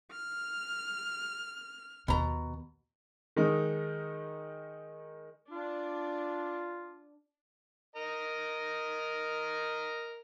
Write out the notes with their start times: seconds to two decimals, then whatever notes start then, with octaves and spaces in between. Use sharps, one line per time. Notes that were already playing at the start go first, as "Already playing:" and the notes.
0.12 F6
2.08 D#2 B2 A#5
3.36 D#3 G#3 D#4
5.52 D4 F4
7.96 A#4 D#5 A#5